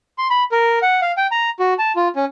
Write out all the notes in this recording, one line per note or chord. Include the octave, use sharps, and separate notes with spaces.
C6
B5
A#4
F#5
F5
G5
A#5
F#4
A5
F4
C#4